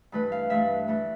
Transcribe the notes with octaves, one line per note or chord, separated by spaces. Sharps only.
G2 E3 A3 B4
F5
G2 E3 A3 E5
E3 A3